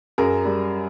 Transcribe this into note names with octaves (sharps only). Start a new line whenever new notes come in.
F#2 G#4 A#4
G3